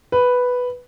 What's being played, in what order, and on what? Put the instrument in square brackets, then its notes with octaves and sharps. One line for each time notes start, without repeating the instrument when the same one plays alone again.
[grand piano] B4